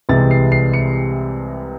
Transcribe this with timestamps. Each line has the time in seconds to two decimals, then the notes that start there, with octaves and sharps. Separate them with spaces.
0.09 C2 C3 E3 G#3 A6
0.31 C7
0.52 C7
0.74 C#7